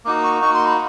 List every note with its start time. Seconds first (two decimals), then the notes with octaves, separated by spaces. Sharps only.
0.05 A#3 D#4 F#4 D6
0.24 C#6
0.41 A#3 D#4 F#4 C#6
0.53 C6
0.66 B5